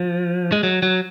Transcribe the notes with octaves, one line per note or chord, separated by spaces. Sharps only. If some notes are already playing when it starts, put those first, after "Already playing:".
Already playing: F3
G#3
F#3
F#3